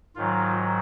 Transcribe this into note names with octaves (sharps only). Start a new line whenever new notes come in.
G#2 D#3 F#3 F4